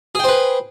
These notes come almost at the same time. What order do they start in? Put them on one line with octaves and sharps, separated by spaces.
G#4 G5 C5 B4